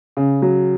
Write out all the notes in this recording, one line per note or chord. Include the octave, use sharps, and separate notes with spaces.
C#3
F#3